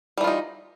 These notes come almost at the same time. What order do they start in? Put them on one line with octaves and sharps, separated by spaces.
G3 E3 F4 D#4